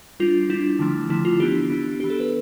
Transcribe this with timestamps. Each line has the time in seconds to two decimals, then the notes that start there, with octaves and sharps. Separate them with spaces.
0.20 G3 D4 F4
0.50 G3 D4 E4
0.79 D3 F3 A3
1.09 D3 F3 A3 E4
1.25 F4
1.40 E3 B3 D4 G4
1.70 E3 B3 D4
2.00 E3 B3 D4 G4
2.10 A4
2.20 B4